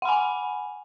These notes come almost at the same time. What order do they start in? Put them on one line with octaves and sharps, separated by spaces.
F#5 B5 G#5